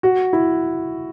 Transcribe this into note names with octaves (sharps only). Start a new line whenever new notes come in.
F#4
E4